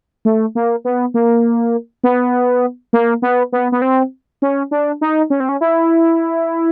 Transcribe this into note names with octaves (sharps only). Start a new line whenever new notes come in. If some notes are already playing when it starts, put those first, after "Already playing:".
A3
A#3
B3
A#3
B3
A#3
B3
B3
B3
C4
C#4
D4
D#4
C#4
C4
C#4
E4